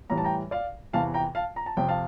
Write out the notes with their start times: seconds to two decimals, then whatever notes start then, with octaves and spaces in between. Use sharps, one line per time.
0.10 A2 E3 G3 A#5
0.18 A5
0.24 G5 A#5
0.51 D5 F5
0.93 E2 C3 E3 F5 A5
1.14 G5 A#5
1.35 F5 A5
1.56 A#5
1.66 A5
1.77 F2 C3 F3 G5
1.89 F5 A5